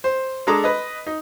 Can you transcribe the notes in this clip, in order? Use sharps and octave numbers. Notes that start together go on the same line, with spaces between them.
C5
G#3 D4 A4 A#5 D#6
B4 D#5
D#4